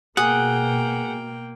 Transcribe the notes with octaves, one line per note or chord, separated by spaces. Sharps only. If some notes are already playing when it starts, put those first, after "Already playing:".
B2 A#3 G#4 F#5 G5